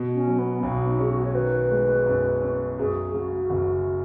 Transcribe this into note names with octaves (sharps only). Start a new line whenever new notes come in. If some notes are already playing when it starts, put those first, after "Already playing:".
Already playing: B2
C#4
F#3
B3
B1 B3
D#4
C#4 G#4
F#4
C#5
D#3 B4
G#3
F#2
C#4
F#2 G#4
C#3 F#4
F#1